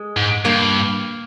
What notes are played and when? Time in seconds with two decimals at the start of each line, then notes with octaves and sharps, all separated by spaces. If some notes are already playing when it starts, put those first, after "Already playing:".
Already playing: G#3
0.17 G#2
0.45 G2 A#3